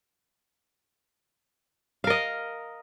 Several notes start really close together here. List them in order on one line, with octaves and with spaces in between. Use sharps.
F5 A#4 D#5